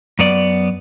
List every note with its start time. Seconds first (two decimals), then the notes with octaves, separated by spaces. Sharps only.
0.19 F#2 B3 D5